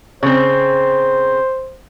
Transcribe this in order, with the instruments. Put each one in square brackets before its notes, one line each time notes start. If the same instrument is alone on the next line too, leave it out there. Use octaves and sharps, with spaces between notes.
[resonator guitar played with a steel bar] C#3 C4 [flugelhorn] C5